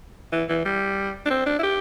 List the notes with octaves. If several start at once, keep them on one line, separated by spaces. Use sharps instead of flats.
E3
E3
G3
D4
C4
D4
E4
G4